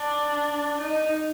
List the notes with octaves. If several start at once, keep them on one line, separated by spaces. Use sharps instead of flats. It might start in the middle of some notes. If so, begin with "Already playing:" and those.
Already playing: D4
D#4